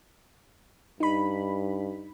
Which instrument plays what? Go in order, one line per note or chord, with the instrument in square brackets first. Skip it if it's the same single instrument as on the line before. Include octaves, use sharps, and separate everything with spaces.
[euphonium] G2 [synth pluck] D#4 B5